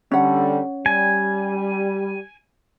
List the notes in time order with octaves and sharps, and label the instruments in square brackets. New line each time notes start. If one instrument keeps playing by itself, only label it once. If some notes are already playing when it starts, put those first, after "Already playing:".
[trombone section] D3 G3 [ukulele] C#4 F#5
[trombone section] G3 [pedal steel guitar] G#5